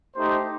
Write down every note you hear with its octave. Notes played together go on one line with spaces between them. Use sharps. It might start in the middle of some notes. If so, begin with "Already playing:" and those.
A3 D#4 G4 C5